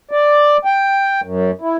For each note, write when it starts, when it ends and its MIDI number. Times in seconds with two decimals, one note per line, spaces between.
0.11 0.57 74
0.65 1.21 79
1.23 1.51 42
1.61 1.77 64